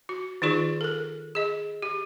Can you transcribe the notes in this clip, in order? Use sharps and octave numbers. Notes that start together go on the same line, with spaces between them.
F#4
D#3 D#4 F4 G#4 D5 C#6
A4 A#4
G#4 D#5
G4